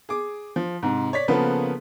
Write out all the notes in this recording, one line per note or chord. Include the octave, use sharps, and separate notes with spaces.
G#4 D6
F3
G#2 C3
C#5 D5 B6
C#3 F3 A#3 B3 A4 B4